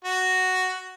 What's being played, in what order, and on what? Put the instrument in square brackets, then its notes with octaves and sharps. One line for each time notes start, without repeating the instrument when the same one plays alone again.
[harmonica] F#4